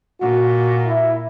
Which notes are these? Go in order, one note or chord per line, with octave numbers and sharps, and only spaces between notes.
A#2 F#4
E4